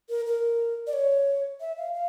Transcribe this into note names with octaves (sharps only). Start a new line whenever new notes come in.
A#4
A#4
D5
C#5
E5
F5
F5